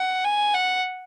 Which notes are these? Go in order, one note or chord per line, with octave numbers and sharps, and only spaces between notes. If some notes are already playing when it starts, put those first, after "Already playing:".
Already playing: F#5
G#5
F#5